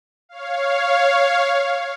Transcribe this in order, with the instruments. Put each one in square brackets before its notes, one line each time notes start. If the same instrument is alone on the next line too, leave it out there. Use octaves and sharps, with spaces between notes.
[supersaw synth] C#5 F5